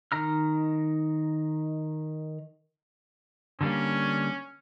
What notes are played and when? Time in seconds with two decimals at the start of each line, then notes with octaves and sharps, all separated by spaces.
0.12 D#3 A#5 F6
3.61 D3 G3 A#3 C#4